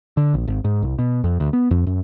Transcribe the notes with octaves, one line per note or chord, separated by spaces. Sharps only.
D3
A#1
G#1
G#2
C2
B2
F2
D2
B3
F2
F#2